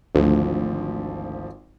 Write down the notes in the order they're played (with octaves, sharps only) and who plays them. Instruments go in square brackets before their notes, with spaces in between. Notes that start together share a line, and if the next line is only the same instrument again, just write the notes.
[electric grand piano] G#1 F3 [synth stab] D2